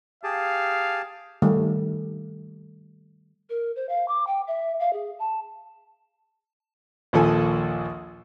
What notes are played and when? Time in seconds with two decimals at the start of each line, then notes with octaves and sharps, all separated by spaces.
0.23 G4 G#4 F5 A5
1.42 D#3 G3 A3
3.50 A#4
3.76 C5
3.89 F5
4.08 D6
4.27 G5
4.48 E5
4.80 F5
4.93 G#4
5.19 A5
7.13 A#1 D#2 F3 A4 G#5